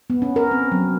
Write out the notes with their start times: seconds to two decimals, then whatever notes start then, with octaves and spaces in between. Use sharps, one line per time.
0.10 B3
0.22 C#4
0.36 A#4
0.51 C4
0.72 F#3